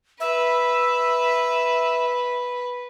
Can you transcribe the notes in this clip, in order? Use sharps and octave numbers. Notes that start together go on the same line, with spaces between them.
B4 E5